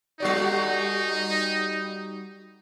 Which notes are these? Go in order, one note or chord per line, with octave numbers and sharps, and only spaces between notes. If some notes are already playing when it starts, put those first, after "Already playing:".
G3 D#4 F#4 D5